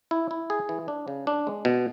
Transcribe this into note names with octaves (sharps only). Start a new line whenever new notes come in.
E4
E4
G#4
E3
D4
C#3
D4
G#3
B2